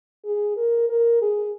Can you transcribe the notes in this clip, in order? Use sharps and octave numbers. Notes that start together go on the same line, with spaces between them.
G#4
A#4
A#4
G#4